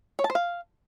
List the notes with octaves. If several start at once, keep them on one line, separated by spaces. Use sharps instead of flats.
C#5
A5
C5
F5